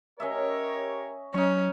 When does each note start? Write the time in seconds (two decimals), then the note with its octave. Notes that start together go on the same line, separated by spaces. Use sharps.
0.20 C#4 G4 A#4 C#5 D#5 E5
1.34 F#3 C#4 D#4 C#6